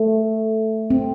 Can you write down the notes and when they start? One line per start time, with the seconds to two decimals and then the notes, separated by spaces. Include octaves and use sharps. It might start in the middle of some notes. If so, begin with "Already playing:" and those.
Already playing: A3
0.90 C4